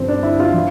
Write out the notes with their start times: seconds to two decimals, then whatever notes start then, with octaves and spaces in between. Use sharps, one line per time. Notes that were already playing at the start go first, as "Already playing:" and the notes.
Already playing: G2 D3 F3 C4
0.08 D4
0.23 E4
0.40 F4
0.54 F3